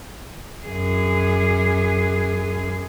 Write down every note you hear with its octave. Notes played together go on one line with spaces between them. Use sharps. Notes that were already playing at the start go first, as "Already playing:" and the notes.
F#2 G#4